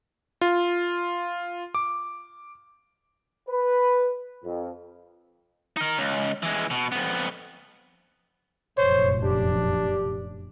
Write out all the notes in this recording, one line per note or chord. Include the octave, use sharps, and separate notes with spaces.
F4
D6
B4
F2
D#4 A#4
C#2
E3 G#3
B2
F2 B3
F1 A#1 F#2 C5 C#5
D4 G4